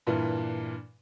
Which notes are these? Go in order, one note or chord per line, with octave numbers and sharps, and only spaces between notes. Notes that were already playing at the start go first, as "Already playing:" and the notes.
G2 A#2 E3